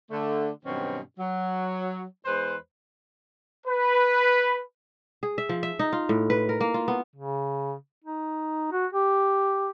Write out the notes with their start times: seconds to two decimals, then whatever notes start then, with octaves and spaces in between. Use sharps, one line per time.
0.11 D3 A3
0.65 G2 B2 D#3 F#3 C4 C#4
1.19 F#3
2.25 E2 G#3 B4 C5
3.67 B4
5.23 G#4
5.38 E5
5.49 F3
5.63 E5
5.79 D#4
5.93 F4
6.09 A2
6.30 B4
6.49 A#4
6.61 A#3
6.74 F4
6.88 B3
7.16 C#3
8.04 D#4
8.72 F#4
8.93 G4